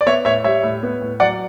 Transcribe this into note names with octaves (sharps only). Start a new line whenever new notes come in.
D5
B3 C#5 E5
A2 C#5 E5
G3 C#5 E5
A2
B3
A2
F#3 D5 F#5